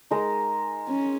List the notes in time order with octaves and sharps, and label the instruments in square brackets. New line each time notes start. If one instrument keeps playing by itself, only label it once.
[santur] G#3 D#4 A#4
[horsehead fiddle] C#4